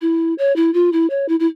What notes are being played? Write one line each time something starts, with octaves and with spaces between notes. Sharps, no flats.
E4
C#5
E4
F4
E4
C#5
E4
E4